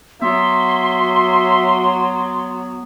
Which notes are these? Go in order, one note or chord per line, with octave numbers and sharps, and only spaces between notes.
F#3 B3 E5 C6